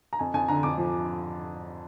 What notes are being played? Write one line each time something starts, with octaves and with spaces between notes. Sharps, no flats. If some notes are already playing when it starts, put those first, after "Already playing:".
A#5
F2 G#5
F2 G#5
D3 A#5
F2 D6
F3